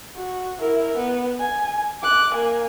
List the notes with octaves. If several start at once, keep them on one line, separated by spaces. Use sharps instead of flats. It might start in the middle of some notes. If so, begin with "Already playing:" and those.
F#4
E4 A#4
B3
G#5
D6 F#6
A#3 G#5